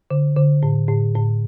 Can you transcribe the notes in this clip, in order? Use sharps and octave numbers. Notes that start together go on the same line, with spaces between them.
D3
D3
A2
A2
A2